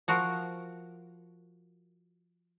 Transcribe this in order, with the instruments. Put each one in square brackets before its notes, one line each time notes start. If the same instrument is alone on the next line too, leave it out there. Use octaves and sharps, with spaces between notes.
[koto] F3 F#4 A#4